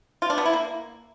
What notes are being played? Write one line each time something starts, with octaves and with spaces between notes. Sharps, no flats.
F4
D4
B3
E4
A#3